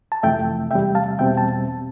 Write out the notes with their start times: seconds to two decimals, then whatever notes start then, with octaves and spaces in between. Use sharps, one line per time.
0.12 A5
0.23 F2 C3 E3 A3 E5 G5
0.71 E2 C3 G3 E5 G5
0.95 F5 A5
1.19 E2 B2 G3 C4 E5 G5
1.37 A5